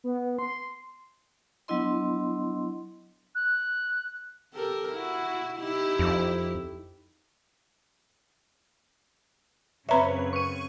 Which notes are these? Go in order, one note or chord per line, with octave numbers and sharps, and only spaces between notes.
B3
C6
F#3 B3 D4 E4 D#5 C6
F#6
G4 A4 A#4
E4 F#4
D#4 E4 G4
F2
F#2 C#3 C4 B4 C#5 E5 A#5 B5
C#6 D#7